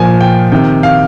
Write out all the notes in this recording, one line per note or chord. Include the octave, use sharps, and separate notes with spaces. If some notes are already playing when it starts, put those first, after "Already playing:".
Already playing: A#2 F3 G#5
G5
C3 D#3 G5
F5